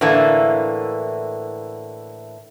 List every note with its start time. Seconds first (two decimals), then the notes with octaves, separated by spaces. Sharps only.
0.01 A2 D3 E3 A3 A#3